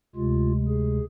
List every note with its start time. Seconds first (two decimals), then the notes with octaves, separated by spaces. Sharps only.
0.15 D2 C3 G#3 F4
0.68 G#4